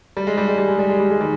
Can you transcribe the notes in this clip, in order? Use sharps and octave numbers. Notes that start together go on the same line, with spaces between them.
G3
G#3
G3
G#3
G3
G#3
G3
G#3
G3
G#3
D#3 G3